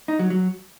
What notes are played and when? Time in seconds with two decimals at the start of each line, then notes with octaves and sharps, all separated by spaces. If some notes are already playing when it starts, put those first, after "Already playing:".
0.08 D#4
0.19 F#3
0.30 F#3